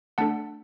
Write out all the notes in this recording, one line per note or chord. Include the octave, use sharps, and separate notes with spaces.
A3 D4 A4 F#5 A5